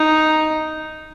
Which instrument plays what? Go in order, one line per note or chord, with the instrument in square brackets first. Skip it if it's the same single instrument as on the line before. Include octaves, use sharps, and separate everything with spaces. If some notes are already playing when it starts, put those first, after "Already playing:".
Already playing: [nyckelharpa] D#4